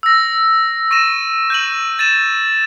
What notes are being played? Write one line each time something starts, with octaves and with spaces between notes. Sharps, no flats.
E6 A#6
C#6 A#6 D#7 E7
G6 D#7 F#7
A6 D#7 E7